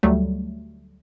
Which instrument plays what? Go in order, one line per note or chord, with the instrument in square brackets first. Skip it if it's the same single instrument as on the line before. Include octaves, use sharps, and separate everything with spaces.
[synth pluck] D2 F#3 G3 A3